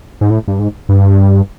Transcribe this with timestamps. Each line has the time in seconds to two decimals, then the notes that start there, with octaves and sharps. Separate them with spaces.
0.21 G#2
0.30 A2
0.48 G2
0.59 G#2
0.89 G2